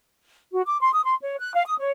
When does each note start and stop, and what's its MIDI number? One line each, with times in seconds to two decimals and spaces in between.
0.52 0.60 66
0.65 0.79 86
0.81 0.89 84
0.92 1.04 87
1.04 1.15 84
1.21 1.37 73
1.38 1.52 90
1.53 1.62 77
1.66 1.76 87
1.79 1.90 73